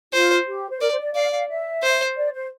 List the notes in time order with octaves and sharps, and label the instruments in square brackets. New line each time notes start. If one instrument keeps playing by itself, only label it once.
[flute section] F4 [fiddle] C5
[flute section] G4
C5
[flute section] A#4 [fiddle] D5
[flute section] C5
D5
[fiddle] D5 [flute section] F5
[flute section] F5
E5
[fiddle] C5
[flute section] D5
C5